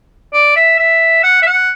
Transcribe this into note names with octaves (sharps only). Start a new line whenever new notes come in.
D5
E5
E5
F#5
E5
F#5